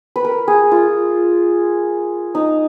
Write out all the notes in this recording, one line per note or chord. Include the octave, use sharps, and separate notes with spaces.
B4
A#4
G#4
F4
D#4